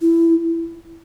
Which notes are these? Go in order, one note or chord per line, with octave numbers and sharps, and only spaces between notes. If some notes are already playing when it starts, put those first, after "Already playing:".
E4